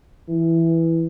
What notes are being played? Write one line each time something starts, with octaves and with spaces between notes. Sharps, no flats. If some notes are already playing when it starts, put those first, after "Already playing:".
E3